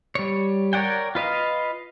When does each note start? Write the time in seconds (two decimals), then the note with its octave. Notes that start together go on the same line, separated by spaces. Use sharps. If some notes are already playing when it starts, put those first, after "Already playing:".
0.15 G3 C#5
0.73 A#4 C#5 D5 F#5 G5
1.15 F4 B4 D#5 F5